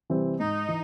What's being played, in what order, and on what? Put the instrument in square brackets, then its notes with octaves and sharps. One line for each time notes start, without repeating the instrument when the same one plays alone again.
[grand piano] C3 E3 G3 C4
[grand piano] G#2 [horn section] D#4
[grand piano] E3